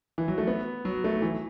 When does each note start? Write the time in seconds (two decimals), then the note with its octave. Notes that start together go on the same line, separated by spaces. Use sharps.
0.18 E3
0.28 F#3
0.38 A3
0.47 B3
0.85 F#3
1.04 A3
1.22 E3